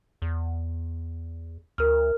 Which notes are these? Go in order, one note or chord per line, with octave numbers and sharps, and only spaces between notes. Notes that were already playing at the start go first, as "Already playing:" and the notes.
E2
D2 A#4 F6